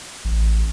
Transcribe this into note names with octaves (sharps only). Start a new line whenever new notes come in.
A1